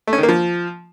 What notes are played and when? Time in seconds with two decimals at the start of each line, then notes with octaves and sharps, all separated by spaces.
0.07 A3
0.13 C#4
0.18 D#3
0.23 A#3
0.29 F3